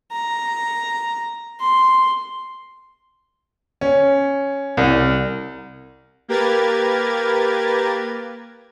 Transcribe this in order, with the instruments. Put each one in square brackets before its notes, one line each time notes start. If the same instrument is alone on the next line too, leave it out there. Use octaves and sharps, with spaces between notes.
[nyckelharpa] A#5
C6
[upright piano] C#4
C2
[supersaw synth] A#3 G4 A#4 B4 G#6 A6